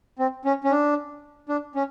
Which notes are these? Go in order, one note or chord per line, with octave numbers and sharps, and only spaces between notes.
C4
C#4
C#4
D4
D4
C#4